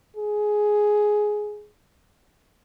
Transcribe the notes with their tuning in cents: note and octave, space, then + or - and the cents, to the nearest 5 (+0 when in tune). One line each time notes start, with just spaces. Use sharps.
G#4 +10